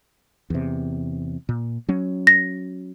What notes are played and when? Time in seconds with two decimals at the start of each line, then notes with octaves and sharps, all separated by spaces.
0.50 E2 C3
1.49 A#2
1.89 F#3 C#4
2.27 A#6